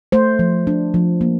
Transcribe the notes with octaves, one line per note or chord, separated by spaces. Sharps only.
A3 C5
F3
D4
F3
A#3